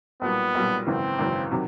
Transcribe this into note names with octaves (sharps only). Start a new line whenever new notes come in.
B1 A#2 G3 B3
B1 A#2 G3
G#1 F#2 C#3 E3 C4
G#1 F#2 C#3 E3
C3 D#3 F#3